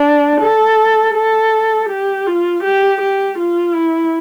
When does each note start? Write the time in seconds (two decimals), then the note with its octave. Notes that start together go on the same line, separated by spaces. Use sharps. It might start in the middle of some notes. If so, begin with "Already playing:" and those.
Already playing: D4
0.41 A4
1.14 A4
1.90 G4
2.27 F4
2.64 G4
3.01 G4
3.38 F4
3.75 E4